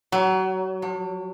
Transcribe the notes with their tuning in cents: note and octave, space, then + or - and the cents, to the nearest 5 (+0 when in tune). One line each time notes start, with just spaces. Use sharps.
F#3 +25
F#3 -45